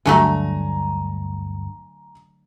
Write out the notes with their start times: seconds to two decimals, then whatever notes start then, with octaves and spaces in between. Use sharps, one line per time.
0.06 G1 D2 G2 D3 F#3 A3 G#5 A#5